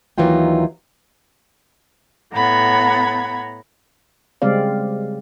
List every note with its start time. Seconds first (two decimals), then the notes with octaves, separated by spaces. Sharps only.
0.18 D#2 E3 F#3 D#4 F4 G5
2.33 A2 B3 F#5 A#5 B5 G#6
4.42 C#3 G3 G#3 C4 D5 F5